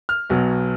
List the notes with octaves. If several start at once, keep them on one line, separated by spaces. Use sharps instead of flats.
F6
B1 B2 F#3